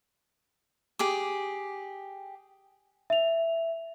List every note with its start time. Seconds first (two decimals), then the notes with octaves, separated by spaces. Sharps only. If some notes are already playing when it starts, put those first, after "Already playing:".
0.99 G4 G#4 D6
3.10 E5 F7